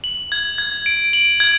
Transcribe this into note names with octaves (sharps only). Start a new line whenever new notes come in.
F#7
G#6
G#6
D7
F#7
G#6